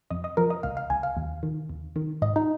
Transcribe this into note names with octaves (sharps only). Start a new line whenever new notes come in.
F2 D#5
D#5
F3 A#4
D#5
C#2 F5
F5
C#2 G#5
F5
D#2
D#3
D#2
D#3
G#2 D#5
D#4